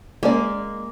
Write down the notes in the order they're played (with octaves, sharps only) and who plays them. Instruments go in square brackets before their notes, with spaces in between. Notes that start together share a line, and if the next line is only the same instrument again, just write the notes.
[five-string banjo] G#3 C#4 D5 [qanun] A#3